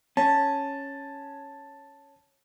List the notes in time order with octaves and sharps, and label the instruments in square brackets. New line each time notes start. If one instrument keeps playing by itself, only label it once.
[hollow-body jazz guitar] C#4 [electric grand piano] A5